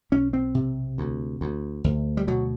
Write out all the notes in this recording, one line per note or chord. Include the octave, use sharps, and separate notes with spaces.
B1 C#4
C4
C3
D2
D2
D2
G3
B2 F#3